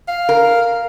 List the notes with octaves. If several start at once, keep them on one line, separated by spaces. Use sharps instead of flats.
F5
A#4